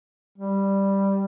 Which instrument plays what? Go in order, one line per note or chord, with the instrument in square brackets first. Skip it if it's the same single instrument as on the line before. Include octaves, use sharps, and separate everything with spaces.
[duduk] G3